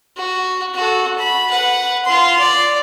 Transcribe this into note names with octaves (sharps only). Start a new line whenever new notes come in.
F#4
F#4 A4
B5
B4 F#5
F4 C6
D5